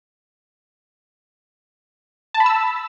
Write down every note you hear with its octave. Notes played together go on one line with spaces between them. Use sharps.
A5
B5
E6